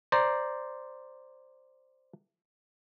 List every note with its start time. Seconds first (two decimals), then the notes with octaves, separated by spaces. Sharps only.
0.12 C5 D5 A#5